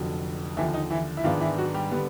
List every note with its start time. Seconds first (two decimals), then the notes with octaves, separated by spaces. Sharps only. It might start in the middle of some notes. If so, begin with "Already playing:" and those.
Already playing: F1 F2 D3 F#3
0.57 D#2 D3 E3 F3 E4
0.74 D#4
0.91 E3 E4
1.17 E4
1.24 G#2 D#3 F3 G#3 B3 D4 F4
1.41 E3 E4
1.58 F#3 F#4
1.74 G3 G4
1.91 D3 G3 B3